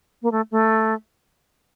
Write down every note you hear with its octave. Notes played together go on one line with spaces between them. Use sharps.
A#3
A3
A3